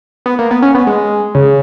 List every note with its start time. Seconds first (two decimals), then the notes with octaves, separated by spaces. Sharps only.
0.26 B3
0.39 A#3
0.51 B3
0.62 C#4
0.75 B3
0.87 G#3
1.35 C#3